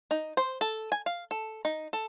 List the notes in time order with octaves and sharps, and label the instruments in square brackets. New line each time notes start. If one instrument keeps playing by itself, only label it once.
[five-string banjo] D#4
C5
A4
G#5
F5
A4
D#4
A4